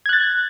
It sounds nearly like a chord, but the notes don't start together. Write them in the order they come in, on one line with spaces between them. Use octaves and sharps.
G#6 F#6 A6